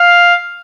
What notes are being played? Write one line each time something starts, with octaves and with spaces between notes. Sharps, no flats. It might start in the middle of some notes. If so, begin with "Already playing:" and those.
Already playing: F5